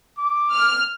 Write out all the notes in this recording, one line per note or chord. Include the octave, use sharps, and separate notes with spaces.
D6
F6